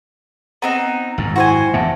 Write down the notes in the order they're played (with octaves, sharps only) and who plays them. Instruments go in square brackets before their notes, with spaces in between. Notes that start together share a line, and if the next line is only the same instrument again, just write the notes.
[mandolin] B3 C4 D#4 [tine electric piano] A#5
[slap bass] G#1 F#2
[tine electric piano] E4 G5 [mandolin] F#4 C5 G#5
[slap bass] E2 G2 A#2 [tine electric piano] E5 F#5 A5